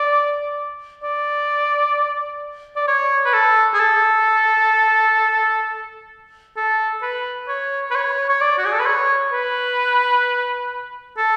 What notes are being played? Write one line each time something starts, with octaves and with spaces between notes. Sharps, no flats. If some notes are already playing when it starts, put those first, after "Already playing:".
Already playing: D5
D5
D5
C#5
B4
A4
G#4
A4
A4
B4
C#5
B4
C#5
C#5
D5
F#4
G#4
A4
B4
C#5
B4
A4